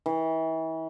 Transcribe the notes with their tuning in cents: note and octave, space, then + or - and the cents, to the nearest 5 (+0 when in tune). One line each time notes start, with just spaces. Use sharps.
E3 -35